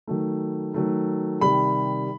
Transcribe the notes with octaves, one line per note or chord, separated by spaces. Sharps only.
D#3 F#3 A3
D#3 F#3 A3
C3 D#3 G3 B5